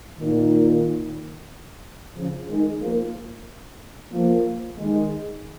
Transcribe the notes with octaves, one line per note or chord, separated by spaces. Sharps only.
A#2 D#3
C#3 F3
D#3 G#3
F3 A#3
F3 A#3
D#3 G#3